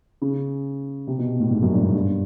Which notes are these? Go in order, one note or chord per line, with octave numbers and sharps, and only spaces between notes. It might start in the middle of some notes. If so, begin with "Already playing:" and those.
C#3
C3
B2
A2
G#2
F#2
G2
G#2
G2